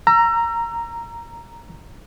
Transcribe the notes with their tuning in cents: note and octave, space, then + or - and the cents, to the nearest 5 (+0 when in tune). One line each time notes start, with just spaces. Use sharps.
A#5 +0 E6 +35